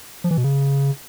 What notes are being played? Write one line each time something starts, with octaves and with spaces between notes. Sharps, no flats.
F3
E3
B2
C#3